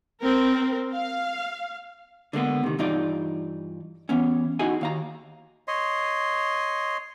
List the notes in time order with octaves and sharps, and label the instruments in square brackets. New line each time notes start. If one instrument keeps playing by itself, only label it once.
[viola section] C4 A#4
F5
[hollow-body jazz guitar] D3 G#3 A#3 B3
C3 D#3
G2 E3 D#4 F4 D5
E3 B3 C#4
D#4 E4 F#4 G#4 G#5
D#2 F5 A#5
[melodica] C#5 D#5 C6